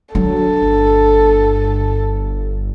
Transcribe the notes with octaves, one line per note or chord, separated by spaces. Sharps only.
F#3 D4 A4
G1